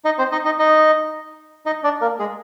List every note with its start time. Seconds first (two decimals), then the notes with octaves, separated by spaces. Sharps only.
0.05 D#4 D#5
0.18 C4 C5
0.32 D#4 D#5
0.45 D#4 D#5
0.59 D#4 D#5
1.66 D#4 D#5
1.84 D4 D5
2.01 A#3 A#4
2.19 G#3 G#4